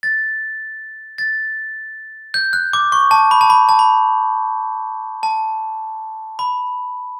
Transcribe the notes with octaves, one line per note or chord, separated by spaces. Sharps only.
A6
A6
G6
F#6
D6
C#6
A5
B5
A5
B5
A5
B5
A5
B5